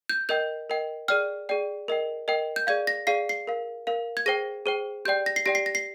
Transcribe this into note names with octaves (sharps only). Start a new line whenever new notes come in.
G6
A#4 D#5 G5 G6
A#4 D#5 G5
G#4 D5 G5 F6
G#4 D5 G5
A#4 D#5 G5
A#4 D#5 G5
G6
G#4 D5 F5 G#6
A#6
G#4 D5 F5 C7
C7
A#4 F5
A#4 F5
G#6
G#4 C5 G5 A#6
G#4 C5 G5
G4 D5 G5 G6
A#6
C7
G4 D5 G5 A#6
C7
A#6
C7